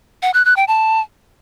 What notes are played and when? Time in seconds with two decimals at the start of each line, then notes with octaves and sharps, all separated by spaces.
0.22 F#5
0.34 F#6
0.45 F#6
0.56 G5
0.68 A5